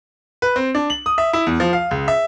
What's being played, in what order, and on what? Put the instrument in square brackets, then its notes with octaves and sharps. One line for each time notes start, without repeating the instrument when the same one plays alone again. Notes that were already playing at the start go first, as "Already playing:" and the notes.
[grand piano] B4
C4
D4
F#7
D#6
E5
E4
E2
F3
F5
C#2
E5